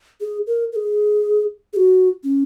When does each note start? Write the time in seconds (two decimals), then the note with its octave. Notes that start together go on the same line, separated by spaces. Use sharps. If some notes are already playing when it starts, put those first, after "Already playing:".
0.21 G#4
0.47 A#4
0.72 A#4
0.76 G#4
1.73 G#4
1.76 F#4
2.24 C#4